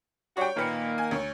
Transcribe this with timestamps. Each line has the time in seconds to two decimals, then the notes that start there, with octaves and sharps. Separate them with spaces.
0.37 G3 D4 F#4 C#5 G5
0.57 A#2 D#3 A#3 B4 C#7
0.98 G#5
1.11 D2 C#5